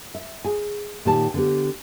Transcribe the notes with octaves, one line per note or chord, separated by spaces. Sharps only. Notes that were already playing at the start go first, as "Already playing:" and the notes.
E5
G#4 G#5
A#2 D#3 G4 C#5 G#5 A5
D3 B3 G4